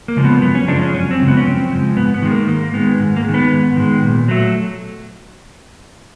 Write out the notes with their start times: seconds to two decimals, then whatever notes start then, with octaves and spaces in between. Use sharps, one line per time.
0.08 A#3
0.17 C#3 F3 G#3
0.25 B3
0.42 F#2 B3
0.55 C#4
0.68 C#3 F3 G#3 D4
0.81 C#4
0.94 F#2 C#4
1.11 C4
1.20 C#3 F3 G#3
1.28 B3
1.37 C#4
1.46 F#2 C4
1.71 C#3 F3 G#3
1.97 G#2 B3
2.14 B3
2.22 D#3 G#3
2.31 A#3
2.48 G#2 A#3
2.74 D#3 G#3 B3
3.00 G#2
3.16 A#3
3.25 D#3 G#3
3.34 B3
3.50 G#2
3.76 D#3 G#3
4.02 A#2
4.28 F#3 A3